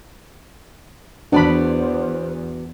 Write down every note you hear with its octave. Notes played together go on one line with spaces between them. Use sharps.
E2 B3 D4 F#4 C5 D5 B5